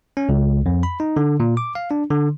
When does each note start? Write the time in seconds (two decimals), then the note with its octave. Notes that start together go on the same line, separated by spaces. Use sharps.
0.17 C#4
0.29 C#2
0.66 F2
0.83 B5
1.00 D#4
1.17 D3
1.40 A#2
1.57 D6
1.75 F5
1.91 D4
2.10 D3